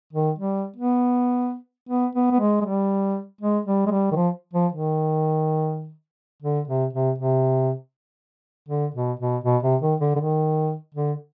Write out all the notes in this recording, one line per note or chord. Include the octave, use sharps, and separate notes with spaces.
D#3
G3
B3
B3
B3
B3
G#3
G#3
G3
G#3
G3
G#3
G3
D#3
F3
F3
D#3
D3
C3
C3
C3
D3
B2
B2
B2
C3
D#3
D3
D3
D#3
D3